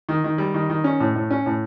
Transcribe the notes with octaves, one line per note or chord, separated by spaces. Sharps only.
D#3
D#3
G3
D#3
D#3
C#4
A2
A2
C#4
A2